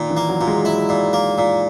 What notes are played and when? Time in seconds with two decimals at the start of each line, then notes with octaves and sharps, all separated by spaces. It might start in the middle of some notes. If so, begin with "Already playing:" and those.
Already playing: A#2 D#3
0.10 E3
0.17 A#3
0.29 F#3
0.39 A#2 F#3
0.47 G#3
0.64 G#3 E4
0.89 A#2
1.13 A#3
1.38 A#2